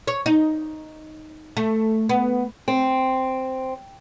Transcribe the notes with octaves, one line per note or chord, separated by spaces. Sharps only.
C#5
D#4
A3
B3
C4